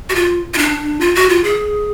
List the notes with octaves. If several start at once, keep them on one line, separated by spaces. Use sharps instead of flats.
F#4
F4
F4
D4
F4
F#4
F4
G#4